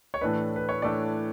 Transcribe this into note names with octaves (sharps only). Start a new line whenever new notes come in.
C#5
A2 E3 A3 D4 B4
B4
C#5
A2 E3 A3 D4 D5